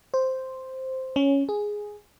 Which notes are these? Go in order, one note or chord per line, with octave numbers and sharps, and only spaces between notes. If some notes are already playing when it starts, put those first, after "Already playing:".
C5
C#4
G#4